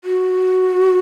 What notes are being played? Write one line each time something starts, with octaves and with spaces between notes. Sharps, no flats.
F#4